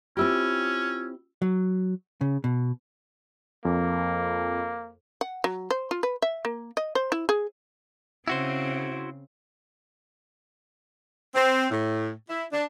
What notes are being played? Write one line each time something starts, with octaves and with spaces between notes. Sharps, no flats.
C4 C#4 E4 F4 G4 E6
F#3
C#3
B2
F2 A#3
F#5
F#3
C5
F4
B4
E5
A#3
D#5
C5
E4
G#4
C#3 C4 E4 F#4 C5
C4
A2
E4
D4